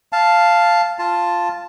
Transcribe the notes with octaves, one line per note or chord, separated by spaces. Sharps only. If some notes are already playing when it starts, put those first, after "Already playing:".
F5 A5
F4 A5